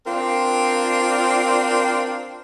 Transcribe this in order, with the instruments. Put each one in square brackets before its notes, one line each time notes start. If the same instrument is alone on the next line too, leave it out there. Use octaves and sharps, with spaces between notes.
[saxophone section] C4 D4 F4 A#4